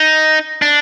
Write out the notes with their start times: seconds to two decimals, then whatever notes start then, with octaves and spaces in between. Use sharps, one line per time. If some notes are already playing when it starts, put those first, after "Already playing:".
Already playing: D#4
0.62 D4